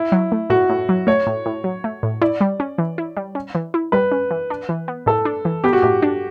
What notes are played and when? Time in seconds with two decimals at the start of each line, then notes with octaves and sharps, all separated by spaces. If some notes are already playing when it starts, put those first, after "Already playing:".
Already playing: E4
0.12 F#3
0.32 A3
0.50 A2 F#4
0.69 A2
0.89 F#3
1.07 A3 C#5
1.27 A2
1.46 A2
1.64 F#3
1.84 A3
2.03 A2
2.21 E4 D5
2.41 G3
2.60 C#4
2.78 E3
2.98 E4
3.17 G3
3.35 C#4
3.55 E3
3.74 E4
3.92 G3 B4
4.12 C#4
4.31 E3
4.50 D4
4.69 E3
4.88 B3
5.06 A2 A4
5.25 D4
5.45 E3
5.64 B3 G4
5.73 F#4
5.82 A2 G4
6.02 D4